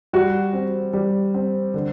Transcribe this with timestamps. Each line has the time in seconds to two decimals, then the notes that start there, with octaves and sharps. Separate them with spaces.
0.13 G3 F#4
0.53 C4
0.93 G3
1.34 C4
1.74 D3